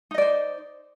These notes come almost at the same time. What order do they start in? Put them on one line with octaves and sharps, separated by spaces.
D#4 D#5 D5 C5